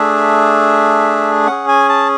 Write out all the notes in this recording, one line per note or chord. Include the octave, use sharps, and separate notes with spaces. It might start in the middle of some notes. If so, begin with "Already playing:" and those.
Already playing: A3 D4 G#4 E5
C#4 G#4 F#5
G#5
A5